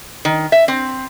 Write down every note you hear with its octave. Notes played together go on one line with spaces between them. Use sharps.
D#3
E5
C4